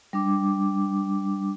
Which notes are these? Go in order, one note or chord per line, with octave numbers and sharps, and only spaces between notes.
G3 D4 D6